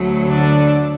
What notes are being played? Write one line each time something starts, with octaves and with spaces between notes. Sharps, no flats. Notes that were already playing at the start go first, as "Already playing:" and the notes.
Already playing: D2 F#3 A3
D3 D4